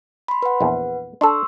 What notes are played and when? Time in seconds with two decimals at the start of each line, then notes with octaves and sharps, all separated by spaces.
0.28 B5 C6
0.42 B4 F#5
0.61 A#1 E2
1.21 D4 A4 C6 C#6 E6